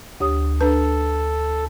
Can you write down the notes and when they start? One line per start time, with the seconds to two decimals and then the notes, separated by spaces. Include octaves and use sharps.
0.20 D2 G4 C#5 D#6
0.61 D4 A4 B4